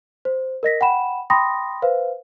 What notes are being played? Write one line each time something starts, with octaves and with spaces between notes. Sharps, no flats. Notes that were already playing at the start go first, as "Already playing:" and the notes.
C5
A#4 D#5 A#6 B6
F#5 G5 B5 E7
G5 B5 C6 D#6 A#6
B4 C5 F5